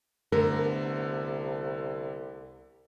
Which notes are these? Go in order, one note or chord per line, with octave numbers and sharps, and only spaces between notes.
C2 D3 A3 B3 A#4